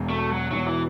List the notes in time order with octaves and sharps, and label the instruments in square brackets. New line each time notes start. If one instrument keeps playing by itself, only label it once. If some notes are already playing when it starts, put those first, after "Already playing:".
Already playing: [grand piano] E1 E2 B2
[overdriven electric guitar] A3
F#3
[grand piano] E1 E2 B2 [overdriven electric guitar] F#3
[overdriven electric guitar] E3